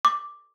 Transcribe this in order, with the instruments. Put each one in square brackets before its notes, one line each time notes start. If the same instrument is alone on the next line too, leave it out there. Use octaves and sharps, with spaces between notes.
[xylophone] D6